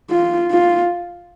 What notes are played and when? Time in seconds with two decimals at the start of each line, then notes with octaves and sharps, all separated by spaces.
0.11 F4
0.51 F4